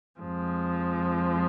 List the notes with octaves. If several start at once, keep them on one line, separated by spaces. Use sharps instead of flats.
F2 F3 G#3